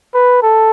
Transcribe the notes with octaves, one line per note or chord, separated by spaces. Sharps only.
B4
A4